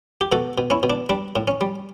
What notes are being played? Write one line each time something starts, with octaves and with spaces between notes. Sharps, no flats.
G4
B2 F#4 A4
B2
C#4 E4
B2
D4
G3 D4
A2
C#4
G3